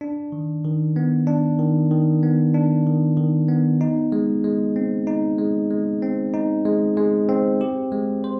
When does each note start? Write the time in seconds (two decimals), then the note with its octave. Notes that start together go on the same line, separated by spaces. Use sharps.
0.01 D4
0.32 D#3
0.64 D#3
0.96 B3
1.27 D4
1.59 D#3
1.91 D#3
2.23 B3
2.54 D4
2.86 D#3
3.17 D#3
3.49 B3
3.81 D#4
4.12 G#3
4.44 G#3
4.76 C4
5.07 D#4
5.39 G#3
5.70 G#3
6.02 C4
6.34 D#4
6.65 G#3
6.97 G#3
7.29 C4
7.61 G4
7.92 G#3
8.24 C5